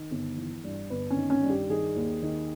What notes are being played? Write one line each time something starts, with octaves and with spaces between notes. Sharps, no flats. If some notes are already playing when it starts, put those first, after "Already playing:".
Already playing: D#3
G1
E3
G2
G1 B4
C#4
D#3
C#4
G2
G4
D#3 G#4
D#2
D#3